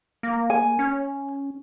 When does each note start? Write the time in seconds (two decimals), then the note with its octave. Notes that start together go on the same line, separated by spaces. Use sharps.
0.23 A#3
0.50 G#5
0.79 C#4